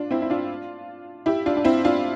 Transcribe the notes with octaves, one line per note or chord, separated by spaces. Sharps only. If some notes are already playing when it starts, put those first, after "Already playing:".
Already playing: D4 F4
C4 E4
E4
D4 F4
E4 G4
D4 F4
D4
C4 E4
D4 F4